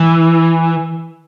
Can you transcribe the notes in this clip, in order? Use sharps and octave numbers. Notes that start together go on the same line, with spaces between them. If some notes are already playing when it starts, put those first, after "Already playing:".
Already playing: E3